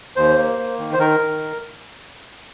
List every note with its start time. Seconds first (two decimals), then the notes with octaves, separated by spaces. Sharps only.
0.16 D#2 C5
0.37 A#3
0.58 A#3
0.78 D#3
0.93 C5
0.99 D#3 A#4
1.20 D#3